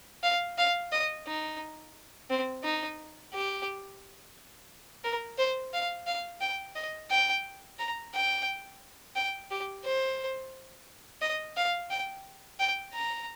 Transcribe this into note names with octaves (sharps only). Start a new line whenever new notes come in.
F5
F5
D#5
D#4
C4
D#4
G4
A#4
C5
F5
F5
G5
D#5
G5
A#5
G5
G5
G4
C5
D#5
F5
G5
G5
A#5